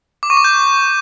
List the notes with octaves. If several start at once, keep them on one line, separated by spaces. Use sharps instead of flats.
D6
C#6
D6
G6